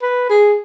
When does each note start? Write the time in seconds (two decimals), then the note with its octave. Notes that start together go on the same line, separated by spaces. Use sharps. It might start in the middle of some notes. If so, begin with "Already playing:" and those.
0.02 B4
0.29 G#4